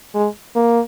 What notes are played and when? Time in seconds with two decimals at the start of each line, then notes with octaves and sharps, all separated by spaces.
0.15 G#3
0.56 A#3